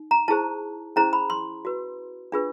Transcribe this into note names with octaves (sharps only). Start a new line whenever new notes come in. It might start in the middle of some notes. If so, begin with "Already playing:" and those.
Already playing: D#4
A#5
E4 G#4 C5 A5
C#4 E4 G#4 C5 A#5
B5
C6
F#4 B4
D4 F4 G#4 B4